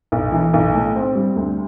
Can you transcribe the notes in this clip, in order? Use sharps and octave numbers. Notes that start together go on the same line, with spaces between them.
B1
E3
B1
A2
C4
G3
D2